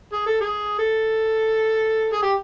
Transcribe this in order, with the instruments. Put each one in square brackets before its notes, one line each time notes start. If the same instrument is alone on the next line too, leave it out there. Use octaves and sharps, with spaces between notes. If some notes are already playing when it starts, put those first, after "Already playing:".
[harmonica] G#4
A4
G#4
A4
G#4
G4